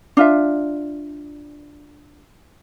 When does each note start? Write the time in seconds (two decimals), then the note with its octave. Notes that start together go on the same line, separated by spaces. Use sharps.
0.17 D4 F4 E5